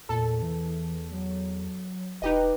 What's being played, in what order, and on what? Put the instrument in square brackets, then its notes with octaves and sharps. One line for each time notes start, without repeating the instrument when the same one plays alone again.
[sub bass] E2 [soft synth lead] A#2 [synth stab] A4
[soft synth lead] E3
F#3
[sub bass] E1 [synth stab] D#4 G4 D#5 [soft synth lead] B4